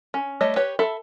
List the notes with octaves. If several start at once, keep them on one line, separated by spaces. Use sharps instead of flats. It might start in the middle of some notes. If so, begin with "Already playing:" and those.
C#4
G3 A3 C#5 D#5
G4 B4 C#5
A4 E5 B5